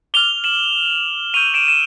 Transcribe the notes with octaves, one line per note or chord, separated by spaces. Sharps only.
D6 F6 F7 G7
E7 F#7
C#6 E6 G6 D#7 F7
D7 E7
E7